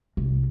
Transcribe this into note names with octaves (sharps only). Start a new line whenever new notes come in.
C2